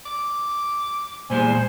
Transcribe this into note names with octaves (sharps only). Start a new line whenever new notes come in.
D6
E2 A#2 G3 G#3 C5 G#5